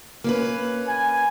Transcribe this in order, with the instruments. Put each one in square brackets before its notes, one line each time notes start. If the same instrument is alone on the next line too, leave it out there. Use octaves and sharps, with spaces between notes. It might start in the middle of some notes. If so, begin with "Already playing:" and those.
[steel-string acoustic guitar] A#3 C#4 B4
[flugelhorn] G#5